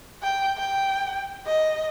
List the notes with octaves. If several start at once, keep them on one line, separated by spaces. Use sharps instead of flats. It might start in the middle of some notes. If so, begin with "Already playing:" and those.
G5
G5
D#5